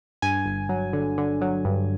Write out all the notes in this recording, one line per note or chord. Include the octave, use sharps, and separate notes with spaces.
G2 G#5
G1
F#3
D3
D3
F#3
G2